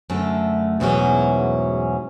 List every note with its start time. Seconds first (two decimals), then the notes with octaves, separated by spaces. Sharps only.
0.10 F#2 D3 A3
0.80 E2 G#2 B2 F#3 C#4